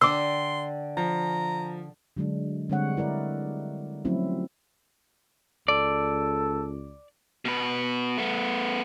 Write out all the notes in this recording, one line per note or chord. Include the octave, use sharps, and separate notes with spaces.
D3 D5 G5 C6 D6 E6
F3 A#5
D3 F#3 G#3 D4
D3 G3 G#3 C4 C#5 F#5
E4 A#4 D5
F3 F#3 A3 C4 C#4 E4
C#2 A4 D5
B2 B4
A3 B3